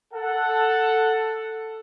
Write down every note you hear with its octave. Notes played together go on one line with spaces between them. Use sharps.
A4 F#5